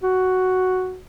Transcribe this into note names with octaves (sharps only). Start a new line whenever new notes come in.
F#4